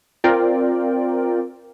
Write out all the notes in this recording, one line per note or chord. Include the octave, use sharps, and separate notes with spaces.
C4 F4 A#4 D5 G5